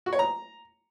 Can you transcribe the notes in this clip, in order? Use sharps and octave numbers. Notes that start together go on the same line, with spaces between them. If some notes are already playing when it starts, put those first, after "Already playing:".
F#4
C#5
A#5